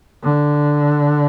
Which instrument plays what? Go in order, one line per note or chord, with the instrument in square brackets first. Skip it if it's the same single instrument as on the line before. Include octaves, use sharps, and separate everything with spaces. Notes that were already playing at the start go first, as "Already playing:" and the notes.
[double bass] D3